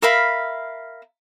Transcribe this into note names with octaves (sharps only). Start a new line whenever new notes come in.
A#4 E5 F5 B5